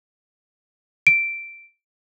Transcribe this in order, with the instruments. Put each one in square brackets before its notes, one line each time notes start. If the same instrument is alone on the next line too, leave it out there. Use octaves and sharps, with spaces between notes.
[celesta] D7